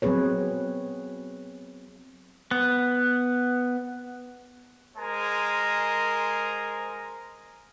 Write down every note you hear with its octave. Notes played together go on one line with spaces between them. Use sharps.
F#3 B3 C4 G#4 B4 C#5
B3
G#3 A#4 C5 G#5 A#5